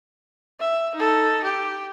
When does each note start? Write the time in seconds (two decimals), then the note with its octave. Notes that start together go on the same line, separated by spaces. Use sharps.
0.60 E5
0.95 D#4 A4
1.44 G4